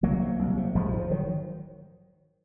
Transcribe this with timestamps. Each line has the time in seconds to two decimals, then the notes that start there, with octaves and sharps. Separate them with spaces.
0.03 C2 F#3 A#3
0.21 C3
0.39 C2
0.57 C3
0.75 A#1 F3 G#3
0.86 F3
0.93 G#2
0.99 F3
1.11 D#3 F#3